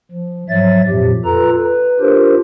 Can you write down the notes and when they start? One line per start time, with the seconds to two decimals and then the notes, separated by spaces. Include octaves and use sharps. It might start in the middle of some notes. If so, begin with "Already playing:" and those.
0.11 F3
0.49 G#2 F3 F#3 C#5 E5 A6
0.88 F2 A#2 F3 G4
1.24 F4 A4 B4 A#5
1.53 B4
2.00 D4 F4 G4 A#4 C5